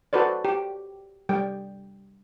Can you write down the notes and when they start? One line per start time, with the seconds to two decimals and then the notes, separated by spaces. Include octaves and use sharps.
0.13 F#4 A4 B4 C5 D5
0.45 G4
1.29 G3 G5